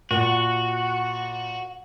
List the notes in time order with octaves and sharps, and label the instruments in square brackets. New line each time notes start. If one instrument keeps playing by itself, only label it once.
[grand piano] A#2 [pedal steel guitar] F#4 [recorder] F#5